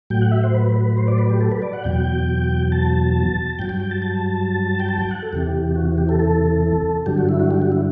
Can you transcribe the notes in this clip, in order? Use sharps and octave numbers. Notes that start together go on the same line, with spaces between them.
A2 F#3 G5
F#5
E5
C5
B4
B4
C5
D5
B4
G4
A4
B4
D5
F#5
E2 B2 F#3 G5
A5
G2 F#3 G5
G5
G5
A5
A5
G5
A5
G5
F#5
A4
E2 C3 E3 G4
F#4
G4
A4
A4
G2 D3 F#3 G4
F#4
E4
F#4
G4
F#4
E4